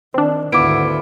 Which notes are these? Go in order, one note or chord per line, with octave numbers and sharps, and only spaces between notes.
D#3 C4 D4
G#1 D2 B3 E4 F4 D6 D7